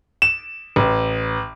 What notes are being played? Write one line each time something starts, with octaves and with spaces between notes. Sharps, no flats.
E7
A1